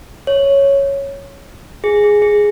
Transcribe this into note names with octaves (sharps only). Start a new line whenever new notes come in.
C#5
G#4
G#4
G#4